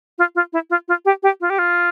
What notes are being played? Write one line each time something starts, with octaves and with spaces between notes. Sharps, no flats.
F4
F4
E4
F4
F4
G4
G4
F4
G4
F4